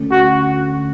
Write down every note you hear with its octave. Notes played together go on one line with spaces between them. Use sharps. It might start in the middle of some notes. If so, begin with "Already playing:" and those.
Already playing: D2 D3 A3 C#4
F#4